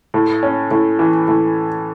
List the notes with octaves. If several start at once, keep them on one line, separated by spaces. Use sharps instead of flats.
A2
C#4
A2
E3
A2